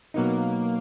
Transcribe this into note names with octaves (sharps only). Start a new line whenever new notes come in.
B2 F#3 A#3 B3 D#4